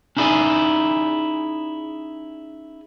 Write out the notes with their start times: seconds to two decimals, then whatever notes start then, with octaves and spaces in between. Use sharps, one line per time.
0.17 C#4 D#4 E4 G#4 D5 G#5